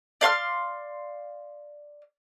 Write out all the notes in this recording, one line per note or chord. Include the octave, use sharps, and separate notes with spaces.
D5 F5 C6 F6